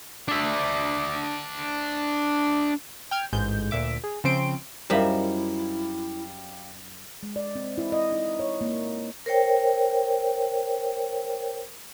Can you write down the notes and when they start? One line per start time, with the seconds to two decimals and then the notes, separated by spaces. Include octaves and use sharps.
0.28 D4 E5
3.11 G5 F6 G#6
3.33 A1 G#2 G#3 G6
3.71 D2 A#2 E5 D6
4.04 G#4
4.24 C#3 F3 C4 C6 D7
4.90 F#2 G3 D#4 E4 C5 E5 F5 B5
7.23 G#3
7.36 D5
7.56 C4
7.78 E4
7.92 D#5
8.12 D#4
8.39 C#5
8.61 A#3
9.26 A#4 C5 C#5 G5